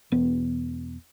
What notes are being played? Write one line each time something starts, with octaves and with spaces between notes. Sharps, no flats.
E1 B3